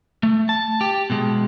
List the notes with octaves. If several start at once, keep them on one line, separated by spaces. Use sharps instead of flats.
A3
A5
G4
B2 G#3